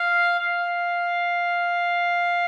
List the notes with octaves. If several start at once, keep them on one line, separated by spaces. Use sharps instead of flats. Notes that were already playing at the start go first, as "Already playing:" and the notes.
Already playing: F5
F5